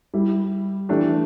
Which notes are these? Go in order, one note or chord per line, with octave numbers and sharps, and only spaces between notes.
G3 E4 G4
E3 A3 D4 G4